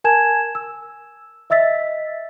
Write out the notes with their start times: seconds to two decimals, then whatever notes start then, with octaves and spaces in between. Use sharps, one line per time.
0.04 A#4 G#5 A5 G#6 E7
0.55 E6
1.50 D#5 E5 E6 A6 B6